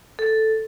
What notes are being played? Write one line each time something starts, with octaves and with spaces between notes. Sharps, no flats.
A4